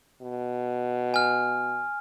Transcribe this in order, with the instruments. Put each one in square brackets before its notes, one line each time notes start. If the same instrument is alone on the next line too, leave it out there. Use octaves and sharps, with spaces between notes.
[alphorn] B2
[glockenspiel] G#5 F6